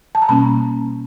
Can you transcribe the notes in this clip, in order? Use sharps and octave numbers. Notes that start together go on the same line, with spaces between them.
A5
A#5
B2 G3 A#3 C#4 A5 B5